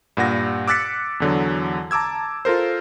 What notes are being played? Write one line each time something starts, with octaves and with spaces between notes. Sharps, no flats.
G2 A#2 F#5 A#6
D6 E6 F#6 A6 B6 C#7
E2 D3 F#3
A5 A#5 D6 E6 G#6
F4 A4 A#4 C5